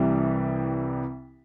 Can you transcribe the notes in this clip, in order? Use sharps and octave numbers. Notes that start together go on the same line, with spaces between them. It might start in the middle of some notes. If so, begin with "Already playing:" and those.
Already playing: C2 C3 E3 G3